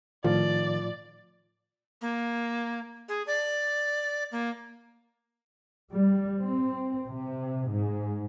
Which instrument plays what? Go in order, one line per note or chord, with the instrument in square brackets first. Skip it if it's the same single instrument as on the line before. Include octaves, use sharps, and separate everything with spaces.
[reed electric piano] A2 F3 F4 [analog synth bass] D#3 [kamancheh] D5
[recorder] A#3
G#4
D5
A#3
[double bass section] G3
C4
C3
G#2